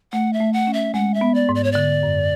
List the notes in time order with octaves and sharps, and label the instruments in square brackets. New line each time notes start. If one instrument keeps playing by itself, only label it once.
[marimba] A3 [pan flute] F#5
[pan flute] E5
[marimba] A3
[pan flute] F#5
[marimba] C#4
[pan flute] E5
[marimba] G#3 [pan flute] F#5
[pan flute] E5
[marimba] B3
[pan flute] D5
[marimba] G#2
[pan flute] D5
C#5
[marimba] D3 [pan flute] D5
[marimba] F#2